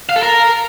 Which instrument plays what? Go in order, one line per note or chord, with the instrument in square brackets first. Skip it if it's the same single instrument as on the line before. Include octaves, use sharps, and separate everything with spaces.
[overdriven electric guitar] F5
A4
A#4